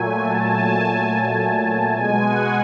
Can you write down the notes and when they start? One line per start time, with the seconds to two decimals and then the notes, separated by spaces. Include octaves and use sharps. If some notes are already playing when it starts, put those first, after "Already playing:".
Already playing: A#2 F#3 A3 G#5
0.22 A5
0.51 G#5
1.95 B2 G#3 G#5
2.25 F#5